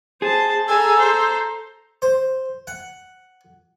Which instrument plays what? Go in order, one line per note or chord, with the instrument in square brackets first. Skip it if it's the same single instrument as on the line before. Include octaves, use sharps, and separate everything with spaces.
[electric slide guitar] G#4 [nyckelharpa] C5 A5
[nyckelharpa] A4 A#5 [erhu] G#5 [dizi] E6
[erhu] C5
[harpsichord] C5
F#5